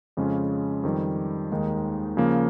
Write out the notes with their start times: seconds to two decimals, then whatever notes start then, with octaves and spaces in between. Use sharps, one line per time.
0.17 F2 C#3 G#3 C#4 F4
0.83 F2 D#3 G3
1.51 D#2 D#3 G#3 D#4
2.17 C#3 F3 A#3